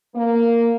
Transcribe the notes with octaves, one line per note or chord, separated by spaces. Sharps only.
A#3